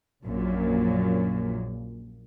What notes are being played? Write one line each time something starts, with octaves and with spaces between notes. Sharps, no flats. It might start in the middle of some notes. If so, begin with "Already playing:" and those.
A#1 F#2 A#2